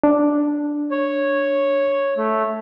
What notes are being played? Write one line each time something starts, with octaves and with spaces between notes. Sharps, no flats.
D4
C#5
A3